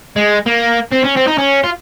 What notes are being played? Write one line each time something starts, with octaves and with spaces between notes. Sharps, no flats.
G#3
A#3
C4
C#4
C4
D#4
C#4
F4